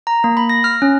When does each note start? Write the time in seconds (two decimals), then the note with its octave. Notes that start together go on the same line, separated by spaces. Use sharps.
0.07 A#5
0.24 A#3
0.37 B5
0.49 A#6
0.64 F6
0.82 C#4